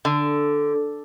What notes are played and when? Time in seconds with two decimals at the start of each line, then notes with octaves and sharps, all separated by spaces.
0.05 D3